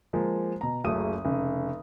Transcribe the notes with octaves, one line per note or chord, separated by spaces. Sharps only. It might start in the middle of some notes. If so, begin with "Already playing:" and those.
F3 G#3 A#3
B2 A#5
F#1 C#2 F#3 A3 D#6 D#7
F1 C#3